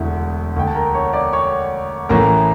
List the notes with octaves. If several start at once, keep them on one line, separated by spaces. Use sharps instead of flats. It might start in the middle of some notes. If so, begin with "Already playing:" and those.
Already playing: E1 D2 D3 E4
D2 D3 G5
A5
A#4 A#5
C#5 C#6
D5 D6
C#5 C#6
A1 A2 E3 A#4 A#5